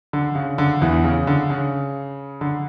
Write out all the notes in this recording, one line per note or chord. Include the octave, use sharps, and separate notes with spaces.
D3
C#3
D3
E2 E3
C#3
D3
C#3
D3